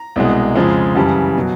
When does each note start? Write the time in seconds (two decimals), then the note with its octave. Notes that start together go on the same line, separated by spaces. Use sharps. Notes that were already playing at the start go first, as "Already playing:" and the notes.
Already playing: A#5
0.16 C2 B2 G#3
0.56 F2 C#3 F3 G#3
0.95 F#2 C#3 E3 G3 A5
1.37 B2 F#3